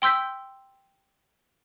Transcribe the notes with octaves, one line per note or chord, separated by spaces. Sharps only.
G5 C6 E6 G6 B6